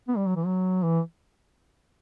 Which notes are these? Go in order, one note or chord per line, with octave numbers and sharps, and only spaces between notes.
B3
G3
F#3
E3
F#3
E3